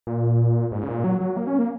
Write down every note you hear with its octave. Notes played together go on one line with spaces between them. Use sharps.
A#2
G#2
C#3
A#2
F#3
F#3
A#3
C#4
A#3